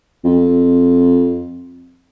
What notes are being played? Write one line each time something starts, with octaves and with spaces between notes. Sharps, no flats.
F2